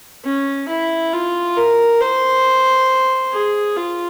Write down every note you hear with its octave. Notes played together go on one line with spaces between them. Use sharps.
C#4
E4
F4
A#4
C5
G#4
F4